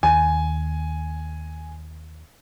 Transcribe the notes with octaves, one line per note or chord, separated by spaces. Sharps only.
D#2 G#5